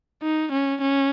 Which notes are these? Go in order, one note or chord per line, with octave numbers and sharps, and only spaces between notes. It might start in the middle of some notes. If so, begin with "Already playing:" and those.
D#4
C#4
C#4